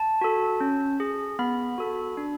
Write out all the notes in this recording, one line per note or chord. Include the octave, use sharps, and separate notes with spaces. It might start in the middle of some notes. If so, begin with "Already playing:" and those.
Already playing: A5
F#4 A4
C#4
G#4
B3 B5
F#4 A4
D4